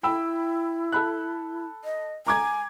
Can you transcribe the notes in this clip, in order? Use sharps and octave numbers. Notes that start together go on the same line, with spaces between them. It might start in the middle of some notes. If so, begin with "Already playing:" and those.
E4 G5 B5 E6
A4 B5 F#6
D#5
G#5 A#5 D6 G#6